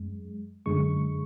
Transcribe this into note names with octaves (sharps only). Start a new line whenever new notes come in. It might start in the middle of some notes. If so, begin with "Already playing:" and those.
Already playing: F#2 G#3
F#2 D3 G#3 C#6